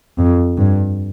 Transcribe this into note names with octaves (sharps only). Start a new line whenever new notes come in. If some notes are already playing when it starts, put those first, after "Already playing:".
F2
G2